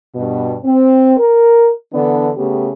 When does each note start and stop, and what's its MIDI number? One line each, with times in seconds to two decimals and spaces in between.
0.15 0.55 43
0.15 0.55 47
0.64 1.13 60
1.17 1.69 70
1.92 2.29 50
1.92 2.29 52
1.92 2.29 59
1.92 2.29 62
2.36 2.69 49
2.36 2.69 57
2.36 2.69 59
2.36 2.69 67